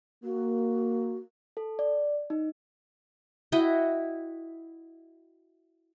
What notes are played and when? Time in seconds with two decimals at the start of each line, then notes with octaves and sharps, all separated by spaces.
0.24 A#3 F#4
1.57 A4
1.79 D5
2.30 D#4
3.52 E4 F#4 D#5 G5